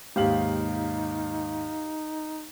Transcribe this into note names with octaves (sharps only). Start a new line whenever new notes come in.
D#2 G#2 D#4 G4 F5 F#7